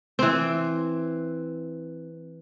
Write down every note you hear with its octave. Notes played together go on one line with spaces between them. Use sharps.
E3 C4